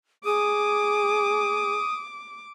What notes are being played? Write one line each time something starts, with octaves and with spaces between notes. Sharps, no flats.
G#4 D6 D#6